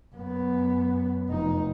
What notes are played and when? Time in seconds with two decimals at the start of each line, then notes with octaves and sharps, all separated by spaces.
0.14 F#2 B3
1.28 F1 D#4